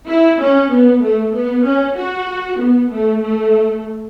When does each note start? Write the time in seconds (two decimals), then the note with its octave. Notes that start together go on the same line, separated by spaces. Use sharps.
0.08 E4
0.40 C#4
0.71 B3
1.02 A3
1.34 B3
1.66 C#4
1.96 F#4
2.60 B3
2.92 A3
3.22 A3